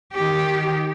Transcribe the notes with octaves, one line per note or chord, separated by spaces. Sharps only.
D#3 G4